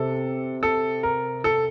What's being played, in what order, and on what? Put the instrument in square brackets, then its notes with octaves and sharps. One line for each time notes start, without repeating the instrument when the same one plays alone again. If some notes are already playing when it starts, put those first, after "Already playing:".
Already playing: [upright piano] C3 [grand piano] A4
[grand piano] A4
A#4
A4